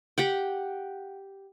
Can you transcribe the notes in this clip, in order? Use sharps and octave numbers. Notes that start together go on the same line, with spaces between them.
G4 F#5 G5